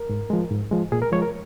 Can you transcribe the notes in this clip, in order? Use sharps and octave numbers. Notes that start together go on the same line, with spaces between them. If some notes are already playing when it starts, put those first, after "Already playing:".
Already playing: A#4
G#2
F3 G#3
G#2
F3 G#3
A#2 G#4
A#4
F3 G#3 C#5
A#4